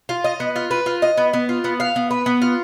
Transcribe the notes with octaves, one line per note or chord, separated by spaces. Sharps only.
F4
D#5
B3
F4
B4
F4
D#5
B3
B3
F4
B3
F5
B3
B4
B3
F4